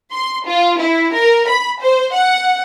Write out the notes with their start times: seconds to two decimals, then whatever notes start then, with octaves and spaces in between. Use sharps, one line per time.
0.12 C6
0.47 F4
0.78 E4
1.13 A#4
1.49 B5
1.81 C5
2.13 F#5